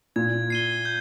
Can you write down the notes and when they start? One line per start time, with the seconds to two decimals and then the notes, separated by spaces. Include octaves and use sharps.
0.16 A#2 G#6
0.50 C7 D#7 G7
0.85 G6